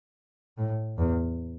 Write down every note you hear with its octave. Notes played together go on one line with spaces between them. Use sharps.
A2
E2